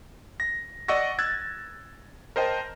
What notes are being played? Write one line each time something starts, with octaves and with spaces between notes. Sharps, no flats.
A#6
D5 D#5 F#5 C#6 E6 A#6
E6 F#6 G#6 A6
A#4 C5 D#5 G5 A5